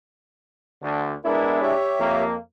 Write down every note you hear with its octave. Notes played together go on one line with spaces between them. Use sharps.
D2 D3
G#3 B3 D4 E4 A#4
G4 C#5 E5
F2 A#3